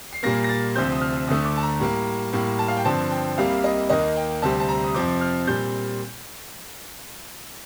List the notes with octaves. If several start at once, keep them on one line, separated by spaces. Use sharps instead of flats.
C7
A#2 G3 A#3 A#6
A#6
A6
D2 C3 F3 C4 G6
D#6
F6
D2 D3 A3 D#6
D6
A5
A#5
A2 G3 A#3
A2 G3 A#3
A5
F5
G5
G2 D3 F3 C4 A5
G5
C2 C3 G3 A#3 F5
D#5
D#2 D#3 A#3 D#5
G5
D2 C3 G3 C4 A5
A5
A#5
D#6
F2 C3 F3 C4 D6
F6
A#2 G3 C4 G6